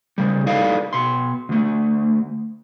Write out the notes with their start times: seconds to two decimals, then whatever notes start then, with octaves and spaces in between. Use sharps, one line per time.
0.18 C#3 G3
0.46 D#4 A4 B4 D5 F5
0.93 B2 C6
1.49 D2 A3